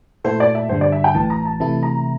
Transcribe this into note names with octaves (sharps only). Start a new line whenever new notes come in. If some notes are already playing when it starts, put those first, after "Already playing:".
A#2 A3 E4 A4 C5
D5
E5
G2 D3 G3 C5
D5
E5
G5
A1 A2 E3 A5
A#5
A5
C3 E3 A3 E4 A5
A#5